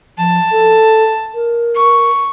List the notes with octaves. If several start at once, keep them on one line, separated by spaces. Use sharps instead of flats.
F3 A5
A4
A#4
C#6